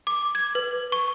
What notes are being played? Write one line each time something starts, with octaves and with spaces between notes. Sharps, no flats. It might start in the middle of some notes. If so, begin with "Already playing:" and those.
D6
G#6
B4
C#6